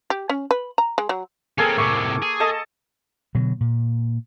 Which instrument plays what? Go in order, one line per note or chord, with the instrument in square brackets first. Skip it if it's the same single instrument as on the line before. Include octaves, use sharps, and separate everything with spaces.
[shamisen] G4
C#4
B4
A#5
G#3
F#3
[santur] A#3 G#4 A4 [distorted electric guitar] C4 C#4
[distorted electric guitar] A2 C3 [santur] C#6 D6
[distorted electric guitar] G#4
[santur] A4 D#5 A5
[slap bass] B2 D3 F#3
A#2